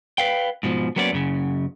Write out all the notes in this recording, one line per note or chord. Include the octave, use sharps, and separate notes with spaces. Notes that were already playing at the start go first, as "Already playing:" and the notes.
B4 F5 G5
G#2 B2 F3
F#3 A#3 B3 C#4 A4 D5
F#2 C#3